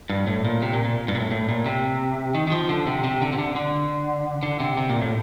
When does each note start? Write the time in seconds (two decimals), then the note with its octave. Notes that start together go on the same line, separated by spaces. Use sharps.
0.10 G2
0.27 A2
0.45 A#2
0.62 C3
0.73 A#2
0.85 A#2
1.08 G2
1.15 A#2
1.20 A2
1.31 A2
1.49 A#2
1.66 C3
2.35 D#3
2.47 D#3
2.52 F3
2.69 D3
2.87 C3
3.04 C3
3.22 D3
3.33 C3
3.38 D3
3.56 D3
4.43 D3
4.60 C3
4.77 C3
4.90 A#2
5.02 A2